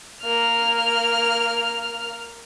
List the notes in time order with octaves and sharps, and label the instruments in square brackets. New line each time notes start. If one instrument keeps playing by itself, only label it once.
[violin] A#3 F6